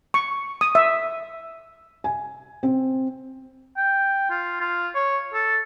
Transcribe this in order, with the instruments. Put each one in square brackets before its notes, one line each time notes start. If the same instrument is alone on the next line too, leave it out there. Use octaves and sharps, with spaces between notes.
[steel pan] C#6
D#6
E5
[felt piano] G#5
C4
[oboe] G5
F4
F4
C#5
A4